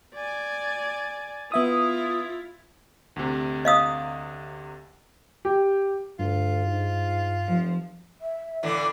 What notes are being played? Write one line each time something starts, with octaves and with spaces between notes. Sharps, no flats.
D5 G#5
B3 E4 F4 E5 D#6
D2 C3
D#5 F5 D#6
G4
D2 G2 F4
G#2
F1 F3
E5
A2 D3 E3 D5